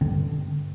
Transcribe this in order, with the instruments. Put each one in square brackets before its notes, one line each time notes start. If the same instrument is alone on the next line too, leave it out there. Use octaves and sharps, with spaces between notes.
[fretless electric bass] G2 D3 C4